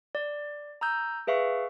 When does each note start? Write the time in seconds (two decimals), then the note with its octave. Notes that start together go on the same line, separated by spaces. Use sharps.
0.15 D5
0.81 A#5 D#6 E6 G6
1.27 G#4 B4 E5 F5 C#6